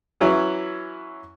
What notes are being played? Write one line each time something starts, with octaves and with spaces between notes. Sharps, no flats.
E3 F#3 C#4 E4